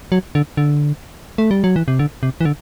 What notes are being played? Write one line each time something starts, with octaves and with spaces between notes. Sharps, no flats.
F#3
D3
D3
A3
G3
F#3
E3
C3
D3
C3
E3
D3